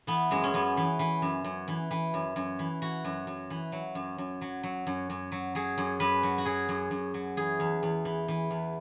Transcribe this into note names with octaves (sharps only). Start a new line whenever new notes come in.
E3 B3
F#2 G#3
C#4
F#2 B3
E3
E3
F#2
F#2
E3
E3
F#2
F#2
E3
E3 F#4
F#2
F#2
E3
F#3
F#2
F#2
F#3
F#3
F#2
F#2
F#3
F#3 G#4
F#2
F#2 B4
F#3
F#4
F#3 G#4
F#2
F#2
F#3
E3 G#4
E2
E2
E3
E3
E2